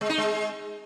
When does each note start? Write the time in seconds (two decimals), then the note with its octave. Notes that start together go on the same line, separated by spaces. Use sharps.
0.01 G#3
0.09 D#4
0.18 G#3